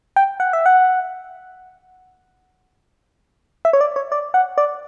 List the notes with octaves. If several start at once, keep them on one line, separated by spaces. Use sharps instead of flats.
G5
F#5
E5
F#5
E5
C#5
D5
C#5
D5
F#5
D5